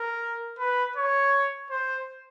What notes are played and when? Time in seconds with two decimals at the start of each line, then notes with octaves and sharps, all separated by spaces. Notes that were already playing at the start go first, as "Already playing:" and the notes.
Already playing: A#4
0.59 B4
0.96 C#5
1.70 C5